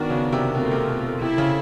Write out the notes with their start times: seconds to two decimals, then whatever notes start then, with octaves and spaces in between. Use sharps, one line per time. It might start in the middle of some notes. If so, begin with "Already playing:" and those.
Already playing: D#3 B3 D4 F#4 A#4
0.10 C#3
0.33 C3
0.55 B2 A3 C4 F4 A#4
0.71 C3
0.88 B2
1.21 C3 C4 E4 A4
1.38 C#3